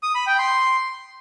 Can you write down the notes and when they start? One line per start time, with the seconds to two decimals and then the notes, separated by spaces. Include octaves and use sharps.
0.03 D#6
0.15 B5
0.27 G5
0.39 C6